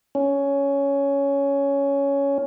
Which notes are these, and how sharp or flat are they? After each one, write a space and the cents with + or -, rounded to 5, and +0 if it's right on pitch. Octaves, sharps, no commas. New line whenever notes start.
C#4 +10